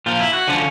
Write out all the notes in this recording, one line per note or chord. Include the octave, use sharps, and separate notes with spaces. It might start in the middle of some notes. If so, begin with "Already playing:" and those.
A#2 F3 F4
E4
F#4
D3 F3 C#4